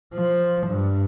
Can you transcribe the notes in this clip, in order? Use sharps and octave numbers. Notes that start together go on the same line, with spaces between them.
F3
G2